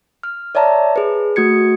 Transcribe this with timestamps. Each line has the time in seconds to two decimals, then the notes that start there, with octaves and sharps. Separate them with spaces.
0.23 F6
0.55 C#5 D5 E5 A5 A#5
0.96 G#4 B4
1.36 A3 F#4 G#6 C#7